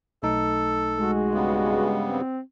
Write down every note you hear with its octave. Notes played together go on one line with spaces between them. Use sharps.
B1 A3 D#4 A4
G#3 F#4
G2 C#3 B3
C4